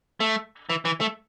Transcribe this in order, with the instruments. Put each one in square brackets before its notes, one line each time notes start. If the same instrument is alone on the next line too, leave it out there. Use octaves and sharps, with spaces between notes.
[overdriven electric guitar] A3
E3
E3
A3